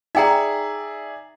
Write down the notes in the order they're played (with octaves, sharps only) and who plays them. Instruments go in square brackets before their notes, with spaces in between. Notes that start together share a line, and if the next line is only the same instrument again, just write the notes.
[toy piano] D#4 G5 A#5 [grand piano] G#4 D5 E5